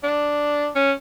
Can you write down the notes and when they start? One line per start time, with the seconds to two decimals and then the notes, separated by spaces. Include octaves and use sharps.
0.04 D4
0.75 C#4